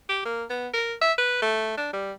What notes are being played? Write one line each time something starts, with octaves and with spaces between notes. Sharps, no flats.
G4
A#3
B3
A#4
E5
B4
A3
D4
G3